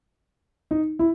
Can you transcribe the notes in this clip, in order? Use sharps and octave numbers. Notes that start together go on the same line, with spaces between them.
D#4
E4